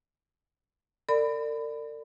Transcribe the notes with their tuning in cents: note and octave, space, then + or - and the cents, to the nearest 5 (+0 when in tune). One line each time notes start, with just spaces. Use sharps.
A#4 -45 D5 +10 B5 +25